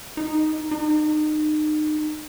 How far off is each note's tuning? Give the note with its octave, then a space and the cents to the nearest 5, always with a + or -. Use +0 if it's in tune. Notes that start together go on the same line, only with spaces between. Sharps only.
D#4 +0
D#4 -30